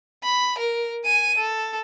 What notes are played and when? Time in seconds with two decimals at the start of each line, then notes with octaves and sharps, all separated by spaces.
0.24 B5
0.58 A#4
1.05 G#5 D#7
1.38 A4